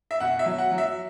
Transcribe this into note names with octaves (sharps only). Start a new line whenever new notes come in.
E5
B2 F#5
E5
F#3
F#5
F#3
E5